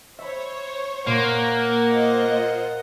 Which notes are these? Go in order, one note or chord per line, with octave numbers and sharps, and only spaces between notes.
C5 C#5 E5 B5
A#2 A#3 A#4 F#5 C6
F4 C5 D#5